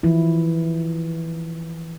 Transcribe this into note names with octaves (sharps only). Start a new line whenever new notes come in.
E3 F3 E4